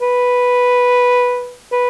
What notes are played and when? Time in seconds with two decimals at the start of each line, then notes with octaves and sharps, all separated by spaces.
0.02 B4
1.72 B4